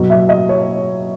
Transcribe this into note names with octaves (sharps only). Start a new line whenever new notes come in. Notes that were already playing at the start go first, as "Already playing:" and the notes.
Already playing: B2 F#3
E5
D#5
C#5